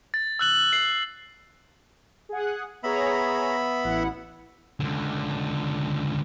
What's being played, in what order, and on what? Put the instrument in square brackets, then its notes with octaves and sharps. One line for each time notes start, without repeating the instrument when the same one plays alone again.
[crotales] A6
E6 F#6 F#7
F#7
C7
[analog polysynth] G#4 F#5
[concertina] B3 E5 B5 [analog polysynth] G#4 C#5 A#5
[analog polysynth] A1 E4 F#5
[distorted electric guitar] C#2 D3